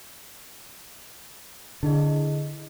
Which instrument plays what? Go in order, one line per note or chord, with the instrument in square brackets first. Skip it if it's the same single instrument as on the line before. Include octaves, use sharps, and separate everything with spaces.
[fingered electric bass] D3 [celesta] E4 G#4 D#5